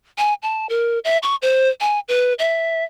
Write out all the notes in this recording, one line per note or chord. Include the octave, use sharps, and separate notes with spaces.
G#5
A5
A#4
E5
C#6
C5
G#5
B4
E5